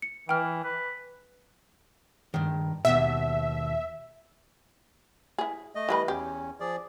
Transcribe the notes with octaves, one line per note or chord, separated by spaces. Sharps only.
C#7
E3 G5 F6
B4
G2 D#3
D#2 B2 E5
E4 G#4
A3 D#5
E3 G3 B4
E2 C#4 G4
F3 G#4 D5